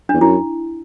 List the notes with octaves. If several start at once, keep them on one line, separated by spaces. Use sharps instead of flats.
E2 D4
F#2 E4